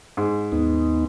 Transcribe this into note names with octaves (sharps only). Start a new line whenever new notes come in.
G#2
D#2 B3 D#4